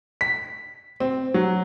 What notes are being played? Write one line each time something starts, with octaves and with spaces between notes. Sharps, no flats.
B6
C4
F#3